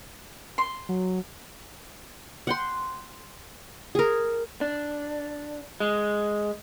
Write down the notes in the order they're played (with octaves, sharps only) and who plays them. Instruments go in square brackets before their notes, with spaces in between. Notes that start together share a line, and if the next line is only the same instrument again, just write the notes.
[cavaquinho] C6
[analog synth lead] F#3
[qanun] F#5 G5 C6
G#4 A#4
[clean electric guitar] D4
G#3